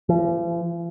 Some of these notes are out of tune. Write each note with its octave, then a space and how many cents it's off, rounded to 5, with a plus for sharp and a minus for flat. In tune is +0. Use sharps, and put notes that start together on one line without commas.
F3 -45